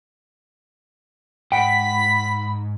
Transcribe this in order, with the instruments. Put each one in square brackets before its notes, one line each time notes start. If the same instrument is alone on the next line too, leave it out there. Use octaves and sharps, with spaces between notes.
[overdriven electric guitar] G#2 [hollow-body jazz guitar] F#5 G5 [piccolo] B5 [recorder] B6